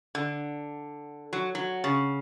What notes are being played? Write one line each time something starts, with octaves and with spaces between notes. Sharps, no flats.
D3
F#3
F#3
C#3